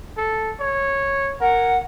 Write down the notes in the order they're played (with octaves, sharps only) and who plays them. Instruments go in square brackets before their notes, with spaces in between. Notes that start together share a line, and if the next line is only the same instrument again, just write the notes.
[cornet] A4
C#5
[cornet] A#4 [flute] F#5